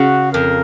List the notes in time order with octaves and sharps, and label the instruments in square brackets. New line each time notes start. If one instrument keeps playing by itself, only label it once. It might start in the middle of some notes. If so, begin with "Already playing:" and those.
Already playing: [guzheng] C#3 [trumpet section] F#4
[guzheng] F2 [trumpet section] A#4